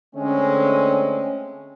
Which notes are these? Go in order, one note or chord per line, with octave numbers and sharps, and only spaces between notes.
D3 G#3 A3 C4 C#4